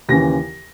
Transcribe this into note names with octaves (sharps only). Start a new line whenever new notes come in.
D#2 C#3 E3 A#6